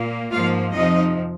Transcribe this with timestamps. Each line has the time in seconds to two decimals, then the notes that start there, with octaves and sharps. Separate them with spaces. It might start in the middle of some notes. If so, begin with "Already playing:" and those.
Already playing: A#2 A#3
0.31 G#2 F3 A#3 F4 F5
0.74 F2 C3 F3 D#4 D#5